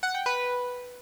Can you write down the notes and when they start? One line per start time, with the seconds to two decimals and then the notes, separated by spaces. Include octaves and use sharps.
0.03 F#5
0.14 G5
0.26 B4